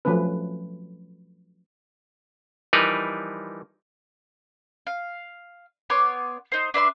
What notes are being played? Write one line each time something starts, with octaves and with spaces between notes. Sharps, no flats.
F3 F#3 A3 C#4 B4
E3 F3 G3 D#4 A#4 B4
F5
B3 C#5 C6 D6
D#4 C5
D4 B4 E5 C6